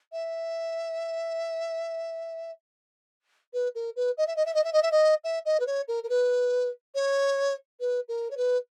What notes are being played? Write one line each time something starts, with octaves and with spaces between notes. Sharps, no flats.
E5
B4
A#4
B4
D#5
E5
D#5
E5
D#5
E5
D#5
E5
D#5
E5
D#5
B4
C#5
A#4
A#4
B4
C#5
B4
A#4
C#5
B4